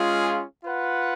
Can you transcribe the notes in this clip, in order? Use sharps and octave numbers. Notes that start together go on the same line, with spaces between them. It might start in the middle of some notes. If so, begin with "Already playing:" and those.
Already playing: G#3 C#4 F4 G#4
F4 B4 F#5